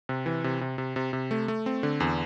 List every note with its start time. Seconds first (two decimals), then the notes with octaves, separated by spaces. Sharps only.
0.09 C3
0.26 E3
0.44 C3
0.61 C3
0.78 C3
0.96 C3
1.13 C3
1.31 A3
1.48 A3
1.66 C4
1.83 D3
2.00 E2